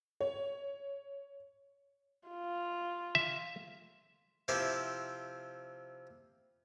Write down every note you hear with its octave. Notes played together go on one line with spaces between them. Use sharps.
C#5
F4
E5
C3 F3 E4 G4 C5